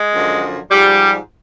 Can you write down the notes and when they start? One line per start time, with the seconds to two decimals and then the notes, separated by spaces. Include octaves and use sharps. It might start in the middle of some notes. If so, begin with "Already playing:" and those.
Already playing: G#3
0.13 F#2 D3 F3
0.71 G#2 F3 G3